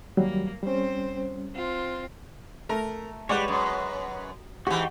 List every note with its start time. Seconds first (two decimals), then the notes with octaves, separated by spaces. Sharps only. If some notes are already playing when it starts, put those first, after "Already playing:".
0.17 D#2 F#3 G3 A#3
0.63 G3 C4 C#4 C5
1.54 C4 F4
2.69 A3 A#4
3.29 G3 G#3 B4 C#5 D5 F#5
3.48 F#2
4.67 G#2 E3 F#4 G4 G5